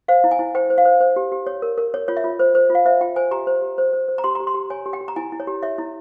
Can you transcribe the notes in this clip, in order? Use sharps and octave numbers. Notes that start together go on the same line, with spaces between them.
C5 F5
E4
G#5
E4
C5 G5
C5
F5
C5
C5
G4
G4
C#5
A#4
A#4
C#5
F4 C#5
E5
F4
C5
C5
F4 F5
C5 E5
F4 G5
C5 G#5
G4 A#5
C5
G4
C5
C5
C5
A#5
G4 C6
G4 A#5
C6
G4
C#5 G#5
G4
G5
G4
A#5
E4 G#5
E4
C#5
G4
C#5 E5
E4